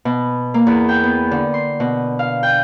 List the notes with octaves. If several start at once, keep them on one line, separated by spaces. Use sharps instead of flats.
B2
A#3
E2
G5
B3
D3
C6
B2
F5
G5